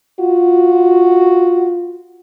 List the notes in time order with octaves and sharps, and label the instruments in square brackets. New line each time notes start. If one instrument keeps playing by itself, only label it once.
[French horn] F4 [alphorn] F#4